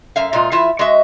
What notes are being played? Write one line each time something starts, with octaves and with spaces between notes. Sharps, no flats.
F#2 E5 F5
A#2 G#3 F4
E3 E4 F4 E5
G#3 F#4 D#5 E5